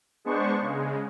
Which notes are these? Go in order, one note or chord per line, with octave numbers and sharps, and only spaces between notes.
G#3 B3 D4 C5 C#6
C#3 G#3